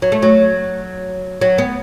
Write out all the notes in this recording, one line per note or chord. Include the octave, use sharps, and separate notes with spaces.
F#3
A3
F#3
F#3
B3